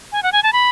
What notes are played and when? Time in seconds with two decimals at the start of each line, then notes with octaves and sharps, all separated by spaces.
0.12 G#5
0.23 F#5
0.32 G#5
0.43 A5
0.53 B5